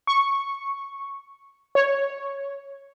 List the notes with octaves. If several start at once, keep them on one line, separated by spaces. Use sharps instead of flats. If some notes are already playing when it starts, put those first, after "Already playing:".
C#6
C#5